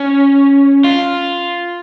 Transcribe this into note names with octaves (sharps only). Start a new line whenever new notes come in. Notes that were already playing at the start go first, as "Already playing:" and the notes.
Already playing: C#4
F4